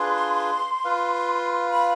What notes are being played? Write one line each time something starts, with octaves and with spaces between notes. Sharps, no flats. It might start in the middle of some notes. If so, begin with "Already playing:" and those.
Already playing: D4 F4 G#4 B4 C6
F4 B4 F5
B5